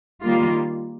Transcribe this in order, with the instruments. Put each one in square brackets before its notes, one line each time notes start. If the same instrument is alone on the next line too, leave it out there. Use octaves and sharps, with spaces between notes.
[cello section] D#3 G3 A#3 F4